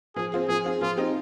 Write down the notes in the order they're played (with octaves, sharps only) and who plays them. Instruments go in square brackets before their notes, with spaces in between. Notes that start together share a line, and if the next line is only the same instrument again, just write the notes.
[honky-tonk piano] F3 [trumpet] G#4
[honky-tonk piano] C4 F4 G#4
[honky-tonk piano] F3 [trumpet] G#4
[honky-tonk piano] C4 F4 G#4
[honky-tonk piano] F3 [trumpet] F4
[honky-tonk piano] C4 D#4 G4